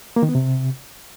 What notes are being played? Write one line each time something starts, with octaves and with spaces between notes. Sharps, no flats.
A#3
D#3
B3
C3